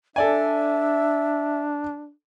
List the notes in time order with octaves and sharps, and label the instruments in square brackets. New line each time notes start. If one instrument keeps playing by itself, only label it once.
[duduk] D4 [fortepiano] A4 D5 G#5 [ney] E5